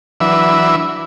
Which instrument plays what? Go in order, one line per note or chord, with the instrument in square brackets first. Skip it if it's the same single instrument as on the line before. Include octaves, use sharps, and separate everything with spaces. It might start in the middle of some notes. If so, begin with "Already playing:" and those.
[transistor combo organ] E3 F#3 D4 B4 E5